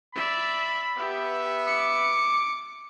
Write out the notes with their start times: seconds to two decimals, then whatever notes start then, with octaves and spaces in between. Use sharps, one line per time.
0.15 D5 E5 B5
0.97 B3 G4 E5
1.67 D6 C#7